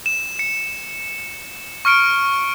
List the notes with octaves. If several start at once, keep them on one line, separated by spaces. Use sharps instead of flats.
E7
C#7
C#6 F6 C#7 D7